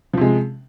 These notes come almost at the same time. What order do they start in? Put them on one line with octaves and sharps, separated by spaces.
F3 C3 G#3